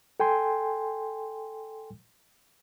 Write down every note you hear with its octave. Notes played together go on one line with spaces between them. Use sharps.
A4 G5 G#5 C6